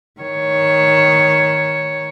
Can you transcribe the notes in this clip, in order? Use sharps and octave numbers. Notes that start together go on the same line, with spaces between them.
D#3 C#5